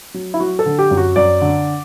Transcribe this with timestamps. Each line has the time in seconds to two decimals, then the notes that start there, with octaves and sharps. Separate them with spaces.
0.14 F#3
0.34 E4
0.40 F#3 F#4
0.59 A4
0.66 D3
0.79 G4
0.91 F#2
0.97 F#4
1.16 F#2 D5
1.41 D3